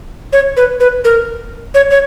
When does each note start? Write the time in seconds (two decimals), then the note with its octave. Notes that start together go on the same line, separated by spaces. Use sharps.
0.33 C#5
0.57 B4
0.80 B4
1.04 A#4
1.74 C#5
1.91 C#5